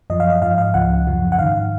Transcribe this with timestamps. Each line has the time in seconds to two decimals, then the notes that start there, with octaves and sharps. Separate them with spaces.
0.10 F#2 F3 D#5
0.20 F5
0.30 D#5
0.42 G#2 F3 F5
0.58 F5
0.74 C#2 C#3 F3 F#5
1.07 F#2 C#3 F3
1.32 F#5
1.38 G#2 D#3 F5